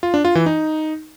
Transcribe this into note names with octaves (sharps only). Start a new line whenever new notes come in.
F4
D4
F4
E3
D#4